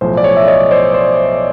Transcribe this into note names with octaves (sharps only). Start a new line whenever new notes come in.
B1 A2 F3 C5
D5
C#5
E5
C#5 D#5
C5 D5
C5